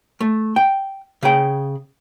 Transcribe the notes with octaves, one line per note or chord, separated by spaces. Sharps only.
A3
G5
C#3 G#4 G5